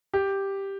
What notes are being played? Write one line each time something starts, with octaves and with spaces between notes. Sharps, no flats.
G4